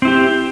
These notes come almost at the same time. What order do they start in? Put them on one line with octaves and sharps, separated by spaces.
C4 E4 G4